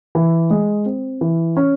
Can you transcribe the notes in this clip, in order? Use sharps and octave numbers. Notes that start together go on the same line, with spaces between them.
E3
G#3
C4
E3
C#4